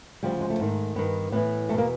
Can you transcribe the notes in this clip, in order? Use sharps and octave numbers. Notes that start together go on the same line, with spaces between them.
D2 C#3 F3 G3
G#3
A3
G#2 D#3
G2 D#3 B3
A2 E3 B3
E2 B2 A3 A#3